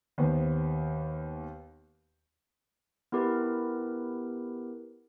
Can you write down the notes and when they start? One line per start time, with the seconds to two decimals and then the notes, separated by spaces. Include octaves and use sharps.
0.18 D#2 B3 C5
3.12 B3 E4 G4 A#4 B4